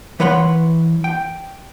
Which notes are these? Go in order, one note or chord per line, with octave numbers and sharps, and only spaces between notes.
E3 B4 C#5 F#5 C6
G5